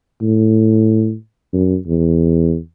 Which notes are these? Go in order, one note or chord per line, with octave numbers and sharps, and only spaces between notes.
A2
F#2
E2